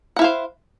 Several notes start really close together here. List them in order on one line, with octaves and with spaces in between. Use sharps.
F#5 E4 F5 C5